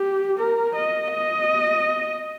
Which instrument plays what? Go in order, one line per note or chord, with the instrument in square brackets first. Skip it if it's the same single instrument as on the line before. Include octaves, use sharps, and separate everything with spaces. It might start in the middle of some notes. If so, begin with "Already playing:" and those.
Already playing: [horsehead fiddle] G4
A#4
D#5
D#5